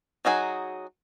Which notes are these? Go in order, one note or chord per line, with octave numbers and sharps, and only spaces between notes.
F#3 D#4 F#4 G#4